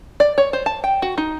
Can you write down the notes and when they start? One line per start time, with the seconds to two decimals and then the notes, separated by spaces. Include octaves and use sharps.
0.20 D5
0.38 C#5
0.53 C5
0.66 A5
0.84 G5
1.02 F#4
1.18 D#4